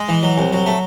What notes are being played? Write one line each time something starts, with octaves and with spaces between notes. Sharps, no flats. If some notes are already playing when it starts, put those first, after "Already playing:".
Already playing: G#3
E3
F#3
C2
F#3
A3